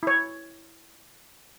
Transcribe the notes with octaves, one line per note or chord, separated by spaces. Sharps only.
E4 C#5